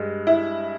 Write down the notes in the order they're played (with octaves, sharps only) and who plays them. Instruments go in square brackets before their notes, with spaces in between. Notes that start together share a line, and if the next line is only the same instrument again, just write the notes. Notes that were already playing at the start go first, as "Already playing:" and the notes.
Already playing: [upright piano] G2 G#3
[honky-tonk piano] E4